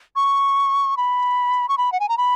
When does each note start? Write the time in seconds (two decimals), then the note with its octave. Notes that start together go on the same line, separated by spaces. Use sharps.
0.16 C#6
0.97 B5
1.69 C#6
1.78 B5
1.92 F#5
2.00 G#5
2.09 A#5
2.18 B5